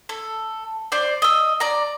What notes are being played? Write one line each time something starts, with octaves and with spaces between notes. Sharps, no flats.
A4
C5 D5
D#5 E6
D5 A#5